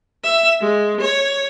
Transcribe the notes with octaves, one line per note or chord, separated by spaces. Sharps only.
E5
G#3
C#5